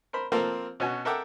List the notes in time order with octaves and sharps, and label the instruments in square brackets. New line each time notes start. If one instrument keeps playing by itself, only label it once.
[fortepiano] A#4 C5 B5
F3 A#3 C4 A4 A#4 F5
B2 C#4 F#4 G#5
A4 A#4 E5 F#5 G5 D6